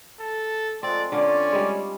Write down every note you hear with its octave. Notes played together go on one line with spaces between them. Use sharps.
A4
F3 G#3 A3 C4 D5
D3 C#4 F4 D5
G3 G#3